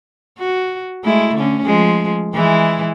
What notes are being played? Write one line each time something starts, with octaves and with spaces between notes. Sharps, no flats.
F#4
G#3 A3 E4
D3 C#4
F3 G#3
E3 G#3 E4